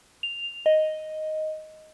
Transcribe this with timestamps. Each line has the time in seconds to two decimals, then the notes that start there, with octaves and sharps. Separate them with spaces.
0.23 F7
0.66 D#5